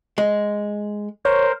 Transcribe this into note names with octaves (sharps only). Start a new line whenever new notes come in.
G#3
A#4 C5 C#5